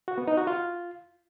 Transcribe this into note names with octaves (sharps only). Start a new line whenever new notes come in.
F#4
B3
D#4
F#4
F4